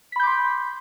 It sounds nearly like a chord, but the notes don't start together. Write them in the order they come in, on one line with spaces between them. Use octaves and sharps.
B6 B5 G6 D6 C6